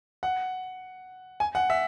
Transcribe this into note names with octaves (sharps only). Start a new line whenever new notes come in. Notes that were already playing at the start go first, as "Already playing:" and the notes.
F#5
G#5
F#5
E5